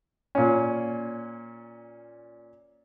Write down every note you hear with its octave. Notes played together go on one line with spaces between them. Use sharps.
A#2 C#4